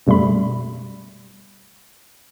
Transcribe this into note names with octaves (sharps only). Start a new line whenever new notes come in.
F#2 B2 G3 A3 B5